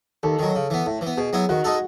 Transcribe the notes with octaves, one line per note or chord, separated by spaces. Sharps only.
D#2 A4
D#3 F#3
C#3
E3 B3
A2
E3
B3
B2 G#4
F#3 B3 E4
D#3 F#4
G#3 D#4 A4